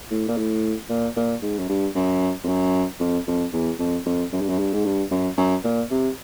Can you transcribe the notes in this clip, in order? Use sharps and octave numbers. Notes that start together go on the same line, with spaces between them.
A2
A#2
A2
A#2
A#2
G#2
F#2
G2
F#2
F2
F#2
F2
F2
E2
F2
F2
F#2
G2
F#2
G2
G#2
G2
F#2
F#2
A#2
C3